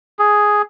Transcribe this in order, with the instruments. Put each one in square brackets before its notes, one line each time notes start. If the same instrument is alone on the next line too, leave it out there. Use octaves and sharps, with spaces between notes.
[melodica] G#4